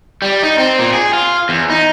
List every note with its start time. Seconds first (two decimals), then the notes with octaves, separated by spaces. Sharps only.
0.22 G3
0.43 D#4
0.58 C4
0.79 A#2
0.94 G#4
1.13 F4
1.49 E2
1.70 D#4